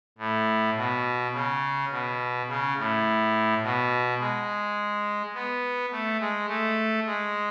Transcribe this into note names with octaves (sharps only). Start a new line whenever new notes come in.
A2
B2
C#3
B2
C#3
A2
B2
G#3
B3
A3
G#3
A3
G#3